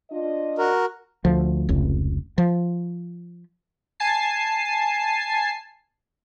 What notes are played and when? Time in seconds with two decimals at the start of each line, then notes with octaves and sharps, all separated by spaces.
0.11 D4 F4 D#5
0.58 F#4 A#4
1.25 D2 F3
1.69 F1 C#2
2.38 F3
4.00 G#5 A5 C7